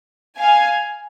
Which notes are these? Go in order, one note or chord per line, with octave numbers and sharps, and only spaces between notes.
F5 G#5